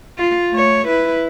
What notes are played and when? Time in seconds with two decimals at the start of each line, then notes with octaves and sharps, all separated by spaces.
0.18 F4
0.51 A3 C#5
0.88 E4 B4